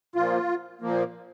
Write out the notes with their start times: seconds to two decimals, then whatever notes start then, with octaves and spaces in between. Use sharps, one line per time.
0.15 A#2 F3 A#3 F4
0.81 A#2 F3 A#3